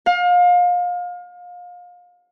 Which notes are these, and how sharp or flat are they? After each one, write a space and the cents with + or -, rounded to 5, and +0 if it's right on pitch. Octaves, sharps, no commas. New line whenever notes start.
F5 +30